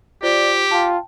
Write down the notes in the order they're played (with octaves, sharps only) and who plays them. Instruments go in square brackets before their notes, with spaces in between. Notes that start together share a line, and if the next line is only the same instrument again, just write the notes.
[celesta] F4 C5 G7 [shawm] G4 [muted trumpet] D5
[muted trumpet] F4 [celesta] G5 A5